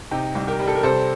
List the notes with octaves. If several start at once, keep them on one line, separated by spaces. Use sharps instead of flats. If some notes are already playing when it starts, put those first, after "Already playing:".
C3 D#4 G4
C2
G4 A#4
G3
A4
A#4
C3 A4 C5